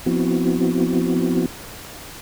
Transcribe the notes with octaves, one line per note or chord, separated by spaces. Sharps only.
F3 B3 C4 E4 F#4